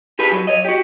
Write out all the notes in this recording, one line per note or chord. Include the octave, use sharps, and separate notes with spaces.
G4 G#4 B4
F#3
C#5 D#5
F#4 G4